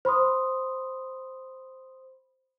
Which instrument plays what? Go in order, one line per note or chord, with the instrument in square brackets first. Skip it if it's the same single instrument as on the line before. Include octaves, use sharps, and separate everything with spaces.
[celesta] C5 B5 C6 D#6